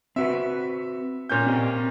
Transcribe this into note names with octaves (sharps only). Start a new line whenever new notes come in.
C4 F#4 B4 E5
A#2 C#4 G6
C4 G4 D#5